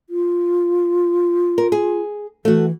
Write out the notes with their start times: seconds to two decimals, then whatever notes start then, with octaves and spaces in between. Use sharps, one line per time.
0.10 F4
1.58 A#4
1.72 G#4
2.45 E3 A3 F#4